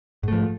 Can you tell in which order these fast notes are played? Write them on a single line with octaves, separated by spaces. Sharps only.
G#2 A3 F3